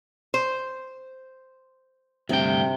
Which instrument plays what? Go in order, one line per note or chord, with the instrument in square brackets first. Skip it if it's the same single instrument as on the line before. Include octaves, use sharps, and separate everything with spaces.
[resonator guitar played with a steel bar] C5
[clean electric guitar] D2 G2 G5 [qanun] C3